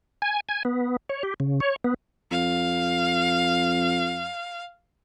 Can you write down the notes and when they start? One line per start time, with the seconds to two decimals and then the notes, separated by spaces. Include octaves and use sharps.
0.22 G#5
0.49 G#5
0.65 B3
1.09 C#5
1.23 G4
1.40 C#3
1.60 C#5
1.84 B3
2.31 F2 F5